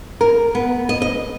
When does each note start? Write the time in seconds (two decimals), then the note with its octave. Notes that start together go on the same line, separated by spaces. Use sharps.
0.21 A#4
0.55 B3
0.89 D#5
1.02 D#5